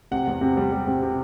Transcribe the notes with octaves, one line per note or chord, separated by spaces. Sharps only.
C3 F#5
E2
C3
G3
G3
C3
C3